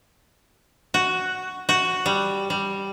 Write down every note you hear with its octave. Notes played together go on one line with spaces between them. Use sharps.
F#4
F#4
G3
G3